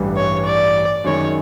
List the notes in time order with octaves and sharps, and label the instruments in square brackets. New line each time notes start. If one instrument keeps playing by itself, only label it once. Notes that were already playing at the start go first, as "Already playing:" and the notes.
Already playing: [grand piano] A1 G2 E3 G3
[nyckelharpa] C#5
D5
[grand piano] F#2 D#3 G#3 [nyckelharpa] C#5